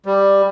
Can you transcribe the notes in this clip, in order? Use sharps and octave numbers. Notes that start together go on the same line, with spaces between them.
G3